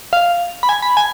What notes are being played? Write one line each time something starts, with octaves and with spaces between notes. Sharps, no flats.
F5
B5
G#5
B5
G#5